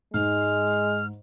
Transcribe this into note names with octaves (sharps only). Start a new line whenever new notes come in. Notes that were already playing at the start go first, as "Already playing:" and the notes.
G#2 G#3 F6